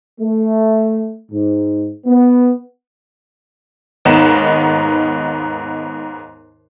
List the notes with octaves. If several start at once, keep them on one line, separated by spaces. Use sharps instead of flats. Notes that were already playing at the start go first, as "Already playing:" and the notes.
A3
G#2
B3
D#2 G#2 B3 D#4 D#5 E7